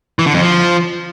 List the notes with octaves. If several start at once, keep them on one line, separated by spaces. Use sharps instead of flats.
E3
D3
F2
F3